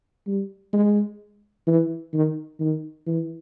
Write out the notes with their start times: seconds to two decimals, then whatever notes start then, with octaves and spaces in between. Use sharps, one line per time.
0.27 G3
0.73 G#3
1.67 E3
2.14 D#3
2.60 D#3
3.07 E3